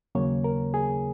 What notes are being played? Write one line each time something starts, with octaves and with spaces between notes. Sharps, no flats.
D#2 C#3 F#3 A#3 C#5
A#4
G#4